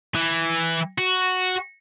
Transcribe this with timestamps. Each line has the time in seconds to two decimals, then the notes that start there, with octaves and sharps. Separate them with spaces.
0.15 E3
0.98 F#4